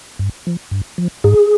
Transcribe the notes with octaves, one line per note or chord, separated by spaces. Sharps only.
G2
F3
G2
F3
G#2 G#4